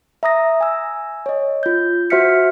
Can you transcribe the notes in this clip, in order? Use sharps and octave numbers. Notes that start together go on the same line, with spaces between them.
E5 A#5 D#6 A#6
G#5 E6
C#5 D#5
F4 G6
F#4 C5 E5 F6 B6 C#7